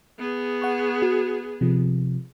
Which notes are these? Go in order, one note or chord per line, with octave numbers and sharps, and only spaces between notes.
B3 G#4
F#5 C#6
F#4
C3 F3